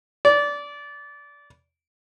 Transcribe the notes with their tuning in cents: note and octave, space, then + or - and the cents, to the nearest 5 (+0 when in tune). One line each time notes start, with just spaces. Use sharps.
D5 -20